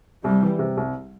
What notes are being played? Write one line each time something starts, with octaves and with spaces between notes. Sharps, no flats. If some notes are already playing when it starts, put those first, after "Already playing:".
C2 G3
E3
C3
C2